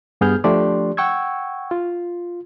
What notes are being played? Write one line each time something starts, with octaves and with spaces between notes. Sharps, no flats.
G2 B3 G#4 F6 G6
F3 A3 D4 G4 D5 C6
F#5 G5 C#6 E6 G#6
F4